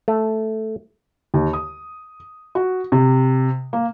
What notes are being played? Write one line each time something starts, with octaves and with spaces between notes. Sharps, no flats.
A3
D#2
D#6
F#4
C3
A#3